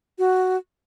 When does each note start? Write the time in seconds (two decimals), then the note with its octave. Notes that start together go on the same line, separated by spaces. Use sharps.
0.19 F#4